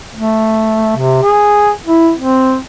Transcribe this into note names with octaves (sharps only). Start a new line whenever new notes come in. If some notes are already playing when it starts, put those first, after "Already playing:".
A3
C3
G#4
E4
C4